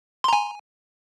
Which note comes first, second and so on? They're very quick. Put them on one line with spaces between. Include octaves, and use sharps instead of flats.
C6 A#5 G#5